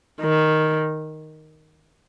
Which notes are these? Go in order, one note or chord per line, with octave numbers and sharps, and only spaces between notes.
D#3